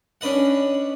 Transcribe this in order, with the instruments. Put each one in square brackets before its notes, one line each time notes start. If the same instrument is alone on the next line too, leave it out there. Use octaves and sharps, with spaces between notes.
[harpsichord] C#4 D4 B4 D#5 F#5